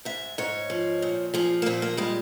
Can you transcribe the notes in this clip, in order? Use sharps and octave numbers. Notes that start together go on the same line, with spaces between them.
G#2 E5
G#2 C#5
F3
A#2
F3 G#4
A#3
A#2 C4
A#3
G3 G#3